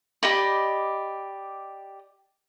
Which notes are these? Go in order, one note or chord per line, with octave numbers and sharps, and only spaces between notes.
G4 D5 D#5 B5